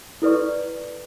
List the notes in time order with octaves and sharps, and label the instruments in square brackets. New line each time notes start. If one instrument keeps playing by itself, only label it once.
[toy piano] E4 A4 B4 D5 C#6